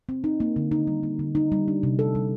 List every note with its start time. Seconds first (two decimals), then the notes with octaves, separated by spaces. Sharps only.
0.09 C4
0.24 D#4
0.40 A#3
0.56 D3
0.71 D#4
0.87 G3
1.03 A#3
1.19 D3
1.35 D#4
1.52 G3
1.68 D4
1.83 C3
1.99 A4
2.15 G3